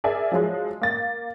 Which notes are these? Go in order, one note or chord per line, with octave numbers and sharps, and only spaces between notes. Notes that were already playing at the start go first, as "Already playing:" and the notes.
G#4 A#4 D5 E5 G#5
F3 F#3 G#3
A#3 A6